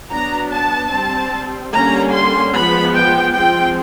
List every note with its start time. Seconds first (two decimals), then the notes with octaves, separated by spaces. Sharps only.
0.11 F#3 B3 D4 A#5
0.51 A5
0.91 G3 C4
1.73 D3 G3 A#3 C#4 A#5
2.12 C6
2.53 F3 G#3 B3 B5
2.94 G5
3.34 F3 G#3 C4 G5